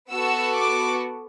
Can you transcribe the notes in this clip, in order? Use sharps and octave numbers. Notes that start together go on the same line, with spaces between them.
B3 F#4 A4 E6
D6